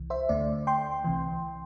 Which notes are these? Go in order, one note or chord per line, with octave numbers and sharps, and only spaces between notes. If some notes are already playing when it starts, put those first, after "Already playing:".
Already playing: C2 C3 E3
C5 E5
D2 D3 A3 D5
G5 C6
C2 C3 E3